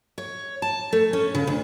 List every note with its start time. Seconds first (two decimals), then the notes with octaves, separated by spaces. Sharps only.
0.18 C#5
0.62 A5
0.92 A3
1.13 C#4
1.35 C#3
1.47 D2